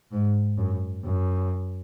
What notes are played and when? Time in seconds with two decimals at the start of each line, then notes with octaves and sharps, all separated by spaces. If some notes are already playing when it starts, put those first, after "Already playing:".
0.12 G#2
0.58 F#2
1.05 F#2